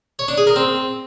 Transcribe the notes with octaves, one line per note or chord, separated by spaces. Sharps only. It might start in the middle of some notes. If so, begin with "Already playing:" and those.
C#5
D4
G#4
A#4
C4